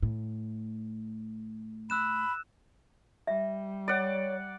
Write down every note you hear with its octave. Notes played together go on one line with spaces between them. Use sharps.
A2
B5 E6 F#6 E7
G3 E5
C#5 D5 F#5